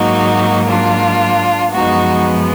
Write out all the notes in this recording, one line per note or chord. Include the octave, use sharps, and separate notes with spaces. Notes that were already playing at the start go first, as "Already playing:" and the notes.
Already playing: G#2 F#3 A#3 D#4 F#4
D4 F4
F#2 F3 G#3 B3 D#4 F#4